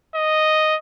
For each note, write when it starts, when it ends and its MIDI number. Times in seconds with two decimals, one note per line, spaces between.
0.15 0.76 75